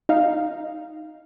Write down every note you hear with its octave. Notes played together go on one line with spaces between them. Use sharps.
D#4 F5